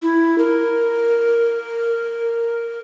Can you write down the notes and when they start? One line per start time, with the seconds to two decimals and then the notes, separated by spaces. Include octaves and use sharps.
0.02 E4
0.38 A#4